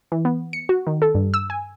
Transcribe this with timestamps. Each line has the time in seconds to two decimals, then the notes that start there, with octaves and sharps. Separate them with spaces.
0.12 E3
0.25 B3
0.53 C#7
0.69 F#4
0.87 D#3
1.02 A4
1.15 G2
1.34 E6
1.50 G#5